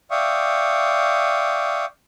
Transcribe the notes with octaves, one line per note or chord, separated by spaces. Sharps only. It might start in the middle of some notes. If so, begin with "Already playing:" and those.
D5 E5 F5 G5 C#6 D#6